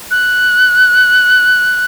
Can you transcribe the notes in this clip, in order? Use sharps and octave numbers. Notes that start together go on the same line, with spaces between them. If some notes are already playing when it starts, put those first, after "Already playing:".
F#6